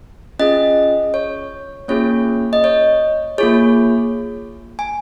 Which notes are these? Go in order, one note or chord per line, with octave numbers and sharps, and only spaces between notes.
C#4 F4 G#4 D#5
C#5
A#3 C#4 F4 G#4 C#5
D#5
C#5
A#3 F4 G#4 C#5
G#5